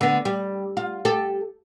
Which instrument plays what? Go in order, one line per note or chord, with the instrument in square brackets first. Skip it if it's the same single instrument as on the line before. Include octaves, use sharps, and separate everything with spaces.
[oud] D3 B3
G3
F4
G4 A4